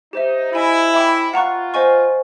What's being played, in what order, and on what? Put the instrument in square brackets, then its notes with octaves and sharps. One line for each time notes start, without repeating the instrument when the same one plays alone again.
[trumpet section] D#4 [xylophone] G4 C5 E5
[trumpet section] E4 [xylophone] D#5 G#5 B5
[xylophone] E5 G5 B5 D6
[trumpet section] F4 [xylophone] F#5 A#5 C#6 F#6
[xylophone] C5 D#5 G#5 C#6